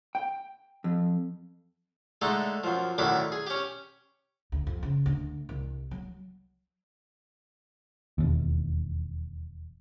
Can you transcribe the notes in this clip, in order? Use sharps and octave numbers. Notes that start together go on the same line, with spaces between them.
G5
F2
D3 G#3 A3 D#4
F#2 F3
F#2 A2 D3 D#3 B5 D6
G#4
C#4 G4
D2
F2
C#3
D2
C2
F#3
E1 D#2